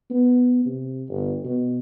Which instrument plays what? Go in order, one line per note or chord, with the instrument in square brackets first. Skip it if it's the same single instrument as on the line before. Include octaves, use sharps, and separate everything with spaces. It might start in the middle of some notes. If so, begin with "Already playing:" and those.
[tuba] B3
C3
G1
B2